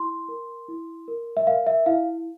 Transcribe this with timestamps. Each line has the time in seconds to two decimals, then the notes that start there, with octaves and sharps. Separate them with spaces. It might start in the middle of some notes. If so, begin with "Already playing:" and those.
Already playing: E4 C6
0.28 A#4
0.69 E4
1.08 A#4
1.37 E5
1.47 A#4 F5
1.67 E5
1.86 E4 F5